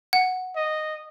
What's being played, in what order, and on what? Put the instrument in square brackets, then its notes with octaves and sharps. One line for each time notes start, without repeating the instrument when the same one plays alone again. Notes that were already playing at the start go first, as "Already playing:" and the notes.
[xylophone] F#5
[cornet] D#5